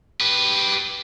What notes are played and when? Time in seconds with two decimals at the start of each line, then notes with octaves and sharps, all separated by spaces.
0.21 G4 B4